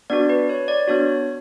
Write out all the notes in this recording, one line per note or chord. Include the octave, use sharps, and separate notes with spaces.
B3 D4 F#4 D5
B4
C#5
D5
B3 D4 F#4 C#5